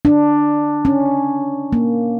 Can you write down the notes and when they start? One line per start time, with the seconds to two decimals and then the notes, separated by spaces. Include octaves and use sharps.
0.05 D4
0.85 C#4
1.73 A#3